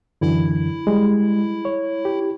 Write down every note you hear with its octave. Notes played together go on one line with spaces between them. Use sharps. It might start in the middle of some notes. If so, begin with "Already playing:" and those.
F#2 D3 E3 E4
G3 G#3
C#5
G4